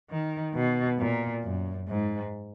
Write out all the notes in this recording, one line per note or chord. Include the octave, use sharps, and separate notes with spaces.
D#3
B2
A#2
F#2
G#2